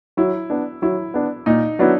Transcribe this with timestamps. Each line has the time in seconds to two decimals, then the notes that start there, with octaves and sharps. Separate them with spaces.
0.17 F#3 E4
0.50 B3 D4
0.82 F#3 E4
1.14 B3 D4
1.46 A#2 D#4
1.79 F#3 B3 D4 E4